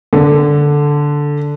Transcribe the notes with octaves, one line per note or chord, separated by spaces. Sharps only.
D3